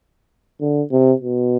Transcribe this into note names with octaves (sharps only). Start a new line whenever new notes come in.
D3
C3
B2